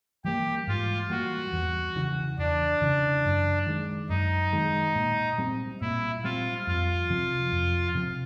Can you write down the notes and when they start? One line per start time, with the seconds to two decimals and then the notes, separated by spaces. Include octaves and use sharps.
0.25 E3 G3 A#3 G4
0.67 G#2 F4
1.10 E3 G3 A#3 F#4
1.53 E2
1.96 C#3 E3
2.38 E2 D4
2.82 C#3 E3
3.25 F#2
3.67 D#3 G#3
4.09 F#2 D#4
4.53 D#3 G#3
4.96 A#2
5.38 G3 C4
5.81 A#2 E4
6.23 G3 C4 F4
6.67 F2 F4
7.10 C3 F3
7.52 F2
7.95 C3 F3